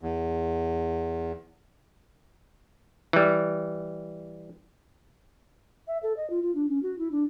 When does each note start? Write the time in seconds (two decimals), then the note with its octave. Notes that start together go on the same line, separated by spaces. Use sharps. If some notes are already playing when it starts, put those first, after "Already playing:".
0.01 E2
3.13 E3 G3
5.87 E5
6.03 A4
6.17 D#5
6.30 F4
6.42 F4
6.55 D4
6.69 C#4
6.83 F#4
6.99 E4
7.11 D4